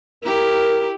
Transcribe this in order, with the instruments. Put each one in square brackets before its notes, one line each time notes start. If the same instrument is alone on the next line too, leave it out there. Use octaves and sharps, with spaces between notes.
[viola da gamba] E4 G4 [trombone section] A#4